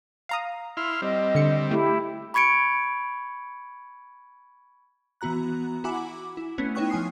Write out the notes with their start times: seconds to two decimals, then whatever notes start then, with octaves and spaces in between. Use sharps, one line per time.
0.29 F5 A#5 D#6
0.77 E4 C6 F6
1.02 G3 C4 D#5
1.35 D3 C#7
1.71 A3 E4 G4
2.34 B5 C#6 G#6 C#7 D7
5.21 E3 B3 F#4 A#5 F#6
5.84 E4 F#4 F#5 G#5 B5 D6
6.37 E4
6.58 A3 B3 C#4
6.75 D#4 E4 C#5 G5 C#6 F#6
6.90 F3 G#5 D#6 C7